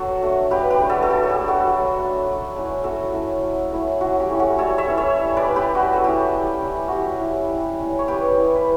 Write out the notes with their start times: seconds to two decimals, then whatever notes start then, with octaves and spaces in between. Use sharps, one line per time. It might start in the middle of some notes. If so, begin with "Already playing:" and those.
Already playing: F#3 F#4 A4
0.22 A3 D4
0.51 F#3 G4 B4
0.70 G4 B4
0.80 A3 D4
0.90 F#4 A4
1.03 A4
1.10 F#3 G4
1.23 A4
1.29 G4
1.39 A3 D4
1.48 F#4 A4
1.67 F#3
1.97 A3 D4
2.26 F#3
2.55 A3 C#4 E4
2.83 F#3 F#4 A4
3.13 A3 C#4 E4
3.42 F#3
3.72 A3 C#4 E4
4.01 F#3 F#4
4.19 G4
4.30 A3 C#4 E4
4.40 F#4 A4
4.58 G3 A4 C#5
4.78 C#5 E5
4.88 C#4 E4
4.97 C#5 E5
5.16 G3
5.37 B4 D5
5.46 C#4 E4
5.56 G4 B4
5.75 G3 F#4
5.93 A4
6.04 C#4 E4 G4
6.33 G3
6.62 C#4 E4
6.88 G3 F#4 G4
7.20 C#4 E4
7.50 G3
7.79 C#4 E4
7.99 C#5
8.08 G3 G4 B4
8.37 C#4 E4
8.55 B4